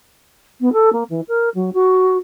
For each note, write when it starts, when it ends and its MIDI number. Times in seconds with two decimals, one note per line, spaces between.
0.60 0.72 59
0.72 0.89 69
0.92 1.03 58
1.09 1.21 52
1.28 1.49 70
1.54 1.69 54
1.73 2.17 66